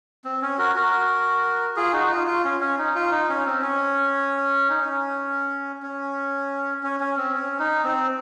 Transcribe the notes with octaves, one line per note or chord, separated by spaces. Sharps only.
C4
C#4
F#4 A#4
F#4 A#4
F4 G#4
D#4 F#4
D#4
F4
F4
C#4
C#4
D#4
F4
D#4
C#4
C4
C#4
D#4
C#4
C#4
C#4
C#4
C4
C#4
D#4
C4